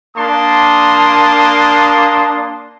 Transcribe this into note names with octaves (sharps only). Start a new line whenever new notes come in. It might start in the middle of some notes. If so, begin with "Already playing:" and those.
A#3 D4 A5 C6 D#6